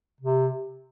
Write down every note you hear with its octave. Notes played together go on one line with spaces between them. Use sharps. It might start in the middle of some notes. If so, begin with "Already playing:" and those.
C3